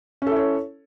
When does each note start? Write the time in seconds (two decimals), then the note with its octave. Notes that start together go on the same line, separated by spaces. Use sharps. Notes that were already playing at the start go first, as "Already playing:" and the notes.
0.22 C#4
0.27 A4
0.31 E4
0.36 C#5